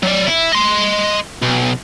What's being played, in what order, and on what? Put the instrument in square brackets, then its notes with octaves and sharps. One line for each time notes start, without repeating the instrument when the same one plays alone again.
[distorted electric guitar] F#3 D5
E4
D#5 C6
B1